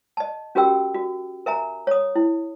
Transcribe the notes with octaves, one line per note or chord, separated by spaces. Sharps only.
D#5 A5
C#4 F#4 G4 A#4 G5 E6
F#4
A#4 E5 G#5 A#5
C#5 D#6
E4